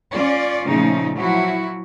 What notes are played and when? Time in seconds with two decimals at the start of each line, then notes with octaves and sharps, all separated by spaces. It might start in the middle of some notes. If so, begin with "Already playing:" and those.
0.12 C#4 F4 D5
0.67 A#2 C#3 F3 A3 D#4
1.15 F3 F#3 E4 F#4